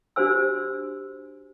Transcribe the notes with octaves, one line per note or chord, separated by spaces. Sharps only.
D4 F#4 G4 C5 G#5 E6